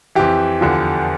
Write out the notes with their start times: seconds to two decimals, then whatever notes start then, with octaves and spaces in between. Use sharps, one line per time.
0.15 F2 E3 G4
0.61 E2 D3 F3